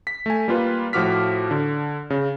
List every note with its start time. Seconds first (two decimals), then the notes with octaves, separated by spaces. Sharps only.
0.07 B6
0.26 A3 G#5
0.48 G3 A#3 F4 B4
0.93 A2 F3 F#4 D6 F6 B6
1.51 D3
2.10 C#3